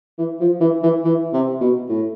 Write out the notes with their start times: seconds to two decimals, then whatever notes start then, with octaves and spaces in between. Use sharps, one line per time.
0.18 E3
0.40 F3
0.61 E3
0.83 E3
1.04 E3
1.33 C3
1.61 B2
1.89 A2